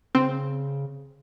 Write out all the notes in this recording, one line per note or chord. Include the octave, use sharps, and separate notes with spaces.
C#3 C4